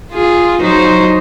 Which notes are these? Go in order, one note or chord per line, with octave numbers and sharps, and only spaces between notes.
F4 G#4
F#3 D#4 C5